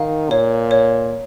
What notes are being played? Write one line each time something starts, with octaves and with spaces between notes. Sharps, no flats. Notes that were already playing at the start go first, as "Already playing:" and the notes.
Already playing: D#3 F5
A#2 C#5
C#5